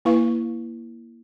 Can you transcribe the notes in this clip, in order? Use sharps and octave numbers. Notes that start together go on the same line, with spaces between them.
A#3 E4 B4 F5 C#6